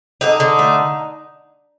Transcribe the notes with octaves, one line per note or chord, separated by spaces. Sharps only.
D3 D#4
D3
A3